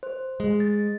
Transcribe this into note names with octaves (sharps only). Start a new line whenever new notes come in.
C5
G#3
A6